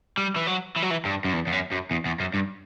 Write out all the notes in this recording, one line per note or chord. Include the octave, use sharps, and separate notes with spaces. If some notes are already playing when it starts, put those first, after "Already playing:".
G3
E3
F#3
E3
F#3
E3
G2
F#2
E2
E2
F#2
F#2
E2
E2
F#2
G2